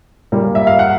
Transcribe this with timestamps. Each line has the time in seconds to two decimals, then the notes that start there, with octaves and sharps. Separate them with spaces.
0.32 A#2 G3 A#3
0.55 E5
0.67 F5
0.79 F#5